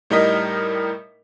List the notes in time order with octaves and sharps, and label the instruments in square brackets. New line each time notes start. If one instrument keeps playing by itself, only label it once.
[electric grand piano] A2 G3 D#4 A#4 D#5 B6